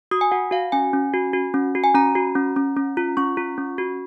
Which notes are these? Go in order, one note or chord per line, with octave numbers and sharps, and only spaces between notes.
F#4 D#6
G#5
F#4 F#5
F#4 F5
C#4 G#5
C#4
F#4
F#4
C#4
F#4
G#5
C#4 A#5
F#4
C#4
C#4
C#4
F4
C#4 C#6
F4
C#4
F#4